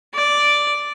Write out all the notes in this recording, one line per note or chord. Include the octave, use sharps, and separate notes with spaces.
D5